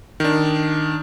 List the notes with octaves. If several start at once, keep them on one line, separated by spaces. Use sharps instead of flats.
D#3 D4